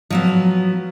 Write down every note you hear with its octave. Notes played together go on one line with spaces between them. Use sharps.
F3 F#3 B3